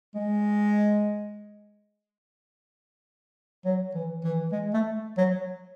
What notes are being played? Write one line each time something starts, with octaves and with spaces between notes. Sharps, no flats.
G#3
F#3
E3
E3
G#3
A3
F#3